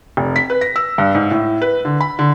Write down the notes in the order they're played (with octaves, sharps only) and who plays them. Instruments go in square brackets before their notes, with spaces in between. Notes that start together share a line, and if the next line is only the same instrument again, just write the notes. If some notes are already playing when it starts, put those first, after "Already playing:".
[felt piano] F1
B6
B4
A#6
E6
G2
G#2
A2
B4
D3
B5
D3